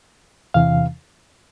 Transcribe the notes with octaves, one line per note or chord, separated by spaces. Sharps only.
E2 C3 E3 F5